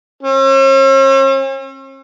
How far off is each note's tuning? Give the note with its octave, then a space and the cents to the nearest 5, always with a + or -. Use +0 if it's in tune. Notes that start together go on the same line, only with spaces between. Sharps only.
C#4 -45